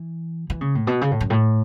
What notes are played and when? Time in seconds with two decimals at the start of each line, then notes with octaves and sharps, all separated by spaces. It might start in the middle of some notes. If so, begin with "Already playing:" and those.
Already playing: E3
0.50 E3
0.61 C#3
0.75 A2
0.87 B2
1.01 C#3
1.11 A2
1.21 F#2
1.30 A2